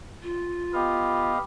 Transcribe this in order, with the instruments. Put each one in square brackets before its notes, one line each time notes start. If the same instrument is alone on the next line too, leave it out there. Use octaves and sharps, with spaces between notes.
[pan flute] F4
[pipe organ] B3 D#5 F5 [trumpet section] G4 B5